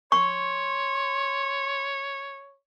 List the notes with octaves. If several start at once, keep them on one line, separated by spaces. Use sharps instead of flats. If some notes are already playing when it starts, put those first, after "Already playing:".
C#5 C6 C#6